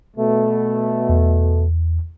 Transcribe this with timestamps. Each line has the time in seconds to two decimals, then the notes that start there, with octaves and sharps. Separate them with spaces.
0.17 B2 A3
1.09 E2